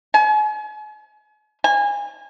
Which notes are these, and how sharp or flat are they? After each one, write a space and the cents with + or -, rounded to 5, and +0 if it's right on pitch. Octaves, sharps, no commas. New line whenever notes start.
G#5 +40
G#5 -25